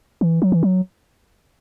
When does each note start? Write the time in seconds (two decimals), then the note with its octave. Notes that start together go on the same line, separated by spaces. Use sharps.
0.21 E3
0.42 F#3
0.52 E3
0.63 F#3